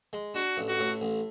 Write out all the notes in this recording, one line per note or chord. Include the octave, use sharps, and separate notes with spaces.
G#3
D4 F#4
A1
F#4
A2
A1